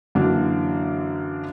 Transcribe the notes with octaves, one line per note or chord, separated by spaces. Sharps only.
F#2 D3 E3 A#3 D4